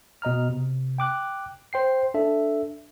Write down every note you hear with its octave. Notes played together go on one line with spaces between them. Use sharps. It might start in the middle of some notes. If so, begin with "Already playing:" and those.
B2 D#5 A#5 F6
C3
G5 D6 F#6
C5 G5 C7
D4 A4 E5